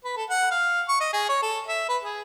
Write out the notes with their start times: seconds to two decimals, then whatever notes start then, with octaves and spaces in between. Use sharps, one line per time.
0.05 B4
0.17 A4
0.30 F#5
0.51 F5
0.89 C#6
1.01 D#5
1.13 G#4
1.29 C#5
1.42 A4
1.68 E5
1.89 B4
2.02 G#4